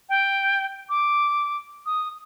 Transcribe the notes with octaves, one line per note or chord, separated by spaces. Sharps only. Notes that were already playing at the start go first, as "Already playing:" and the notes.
G5
D6
D#6